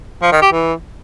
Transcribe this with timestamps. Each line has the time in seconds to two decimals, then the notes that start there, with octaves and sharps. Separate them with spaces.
0.22 F3
0.32 D#3
0.42 G4
0.52 E3